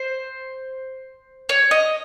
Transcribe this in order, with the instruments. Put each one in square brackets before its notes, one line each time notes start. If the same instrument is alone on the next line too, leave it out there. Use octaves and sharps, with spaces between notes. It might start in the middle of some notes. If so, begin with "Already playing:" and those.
Already playing: [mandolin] C5
C#5
D#5